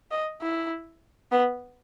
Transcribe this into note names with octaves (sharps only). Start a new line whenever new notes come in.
D#5
E4
B3